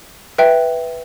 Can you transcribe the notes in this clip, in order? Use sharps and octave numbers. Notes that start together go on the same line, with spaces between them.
B4 E5 G5